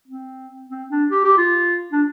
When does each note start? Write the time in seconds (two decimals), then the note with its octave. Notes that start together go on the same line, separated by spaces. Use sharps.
0.08 C4
0.70 C4
0.91 D4
1.11 G4
1.24 G4
1.38 F4
1.92 D4